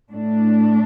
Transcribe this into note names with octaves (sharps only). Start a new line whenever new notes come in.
A2 A3 D4